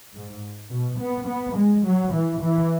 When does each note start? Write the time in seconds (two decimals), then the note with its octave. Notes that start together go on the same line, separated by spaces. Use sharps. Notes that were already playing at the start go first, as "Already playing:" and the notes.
0.14 G#2
0.71 B2
0.99 B3
1.27 B3
1.56 G#3
1.85 F#3
2.13 E3
2.42 E3